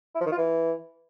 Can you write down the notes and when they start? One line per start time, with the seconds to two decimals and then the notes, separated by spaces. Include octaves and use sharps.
0.15 E4
0.21 F3
0.26 D#3
0.32 F4
0.37 E3